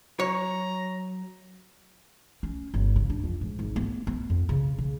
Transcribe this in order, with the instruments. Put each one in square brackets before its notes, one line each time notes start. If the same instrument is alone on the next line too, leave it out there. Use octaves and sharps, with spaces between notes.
[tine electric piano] F#3 [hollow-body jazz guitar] C#5 [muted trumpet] A#5
[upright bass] C#4
G1
C#3
D4
F2
G#2
G#1
B3
B3
F2
C#3
C#3